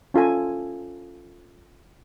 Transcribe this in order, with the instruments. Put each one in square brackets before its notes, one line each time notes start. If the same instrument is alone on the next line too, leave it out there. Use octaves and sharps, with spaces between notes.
[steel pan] C#4 F4 A4 G#5